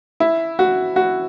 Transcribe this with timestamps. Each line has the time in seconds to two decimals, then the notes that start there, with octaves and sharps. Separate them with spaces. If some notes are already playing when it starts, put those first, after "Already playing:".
0.20 E4
0.59 F#4
0.96 F#4